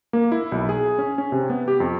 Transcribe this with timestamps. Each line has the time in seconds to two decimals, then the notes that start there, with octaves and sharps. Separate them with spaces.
0.13 A#3
0.32 E4
0.52 B1
0.69 G#4
0.99 C#4
1.18 C#4
1.32 C3
1.50 B3
1.68 G4
1.80 F2